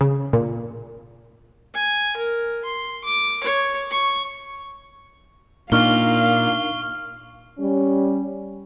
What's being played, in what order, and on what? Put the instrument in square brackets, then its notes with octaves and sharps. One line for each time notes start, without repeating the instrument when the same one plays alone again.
[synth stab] C#3
A#2
[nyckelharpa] G#5
A#4
C6
D6
C#5
C#6
[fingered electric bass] A#2 [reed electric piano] D4 D#4 A#4 [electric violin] F5 [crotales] C#6 F6 G7
[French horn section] G3 C#4